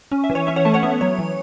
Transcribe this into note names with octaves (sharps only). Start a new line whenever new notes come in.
C#4
E5
E3
C#5
C#4 E5
C#5 F#5
A3 E5 A5
C#5 F#5
B3 E5
F#3 C#5
E3